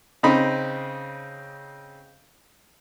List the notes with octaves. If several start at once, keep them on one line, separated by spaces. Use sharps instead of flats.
C#3 C4 D#4 B5